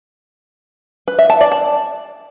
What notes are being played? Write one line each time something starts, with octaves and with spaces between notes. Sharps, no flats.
B4
E5
A5
D5
A5